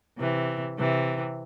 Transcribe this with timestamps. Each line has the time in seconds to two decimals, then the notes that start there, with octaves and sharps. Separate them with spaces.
0.18 C3 E3
0.78 C3 E3